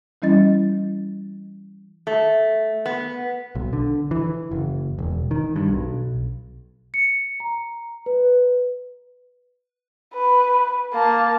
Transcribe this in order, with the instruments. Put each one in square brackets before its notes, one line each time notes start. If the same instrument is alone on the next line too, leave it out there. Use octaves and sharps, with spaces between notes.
[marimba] E3 G3 C#4 E4 D#5 A6
[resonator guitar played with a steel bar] A3
B3
[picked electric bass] B1
D3
E3
F#1
E1
D#3
G2
B1
[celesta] C#7
A#5
B4
[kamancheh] B4
A#3 A5